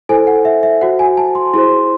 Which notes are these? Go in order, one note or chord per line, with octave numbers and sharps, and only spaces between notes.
E4 A4 C5 G#5
F#5
E5
E5
F#4 C5 F#5
G#5
A5
C6
E4 G#4 C5 C6